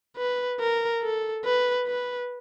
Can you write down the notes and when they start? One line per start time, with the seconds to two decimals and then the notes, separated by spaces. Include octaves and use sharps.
0.17 B4
0.60 A#4
1.02 A4
1.45 B4
1.87 B4